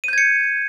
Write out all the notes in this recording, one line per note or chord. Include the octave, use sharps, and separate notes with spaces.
G6 G#6 C#7 D#7